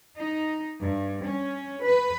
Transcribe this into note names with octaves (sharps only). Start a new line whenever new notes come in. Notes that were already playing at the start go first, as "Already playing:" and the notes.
D#4
G2
C#4
B4